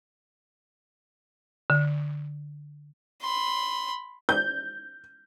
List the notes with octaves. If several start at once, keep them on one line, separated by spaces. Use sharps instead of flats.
D3
B5 C6
G6